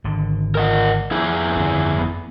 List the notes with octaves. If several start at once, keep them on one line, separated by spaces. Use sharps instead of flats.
G#1 D3
A#4 D#5 F#5
F2 E4 G#4
G1 C4
B3